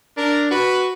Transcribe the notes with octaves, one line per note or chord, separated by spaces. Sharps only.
D4 A#4
F#4 B4